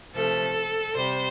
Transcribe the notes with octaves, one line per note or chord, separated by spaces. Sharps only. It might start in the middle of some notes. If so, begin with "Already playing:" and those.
C3 F3 A3 A4
C3 G3 C5